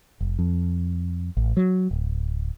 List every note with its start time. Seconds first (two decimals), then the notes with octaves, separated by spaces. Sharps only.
0.21 F1
0.39 F2
1.37 A1
1.57 F#3
1.91 D1